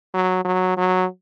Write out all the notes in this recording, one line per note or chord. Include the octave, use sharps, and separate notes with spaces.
F#3
F#3
F#3